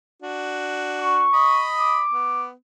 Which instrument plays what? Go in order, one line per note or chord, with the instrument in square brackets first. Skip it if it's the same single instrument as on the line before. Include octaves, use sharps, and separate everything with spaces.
[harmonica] D4 F#4
[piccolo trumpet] C#6
[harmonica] D#5 B5 D#6
[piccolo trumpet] D6
[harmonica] B3